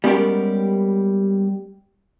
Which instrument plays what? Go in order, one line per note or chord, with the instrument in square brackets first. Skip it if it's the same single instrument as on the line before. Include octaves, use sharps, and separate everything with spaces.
[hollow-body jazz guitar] G3 G#3 B3 C#4 G4 A#4